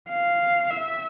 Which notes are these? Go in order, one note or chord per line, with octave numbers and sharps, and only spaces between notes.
F5
E5